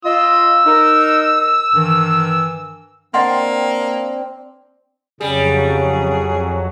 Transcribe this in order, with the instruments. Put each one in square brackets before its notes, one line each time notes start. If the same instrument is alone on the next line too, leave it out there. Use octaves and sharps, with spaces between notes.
[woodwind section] F4 D#5 [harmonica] E6
[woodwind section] D#4 A#4
G2 D#3 E3
[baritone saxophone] A#3 [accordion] C4 [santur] D4 G5 [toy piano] D#5 F#5 C6
[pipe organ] F2 F#3 [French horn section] C#3 [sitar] G3 [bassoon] G#4